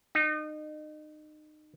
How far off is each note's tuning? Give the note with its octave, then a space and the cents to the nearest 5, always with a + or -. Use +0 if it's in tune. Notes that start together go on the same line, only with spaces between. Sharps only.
D#4 -30